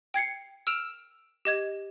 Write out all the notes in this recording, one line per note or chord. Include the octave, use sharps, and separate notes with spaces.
G5 G#6 C7 C#7
E6 F6 D7 E7 F7
G4 D#5 G#6